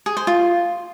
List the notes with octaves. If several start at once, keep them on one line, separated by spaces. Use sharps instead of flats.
G#4
C5
F4